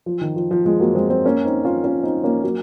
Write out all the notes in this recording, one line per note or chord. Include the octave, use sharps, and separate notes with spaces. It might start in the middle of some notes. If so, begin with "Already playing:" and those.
F3
D#3
F3
F3
F3 G#3
F#3 A#3
G#3 C4
G#3 C4
A#3 C#4
C4 D#4
C#4 F4
C#4 F4
C4 D#4
A#3 C#4
F#3 A#3